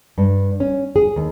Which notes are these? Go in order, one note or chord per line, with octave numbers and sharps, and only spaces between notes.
G2
C#4
G#4
D#2